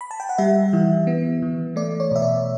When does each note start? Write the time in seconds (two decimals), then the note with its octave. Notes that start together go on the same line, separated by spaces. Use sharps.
0.01 B5
0.11 A5
0.20 G5
0.29 F#5
0.38 G3 E5
0.73 E3
1.07 B3
1.42 E3
1.76 A3 D5
2.00 C#5
2.11 B2 E5
2.22 D5